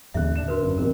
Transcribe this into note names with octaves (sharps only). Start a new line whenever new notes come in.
D#1 A1 D#2 G#2 D3 E5 F#6
D4 E7
F#4 A#4 B4
G#1 F#2 C#3 D4
A1 E2 C3 A#4